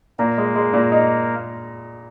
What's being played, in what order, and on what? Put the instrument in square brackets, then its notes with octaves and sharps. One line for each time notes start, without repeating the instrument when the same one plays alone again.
[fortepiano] A#2 [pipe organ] A#3
[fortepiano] G#3
G#3
A#2
D#4